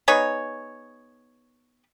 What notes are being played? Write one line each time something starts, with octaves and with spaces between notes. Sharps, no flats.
B3 D#4 G#4 C#5